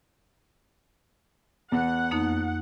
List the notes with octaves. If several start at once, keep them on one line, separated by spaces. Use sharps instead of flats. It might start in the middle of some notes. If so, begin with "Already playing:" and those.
E2 F#5
F2 A#3 D#4